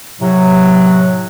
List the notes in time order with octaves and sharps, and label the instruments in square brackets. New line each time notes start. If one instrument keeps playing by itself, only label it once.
[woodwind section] A2 C3 F#3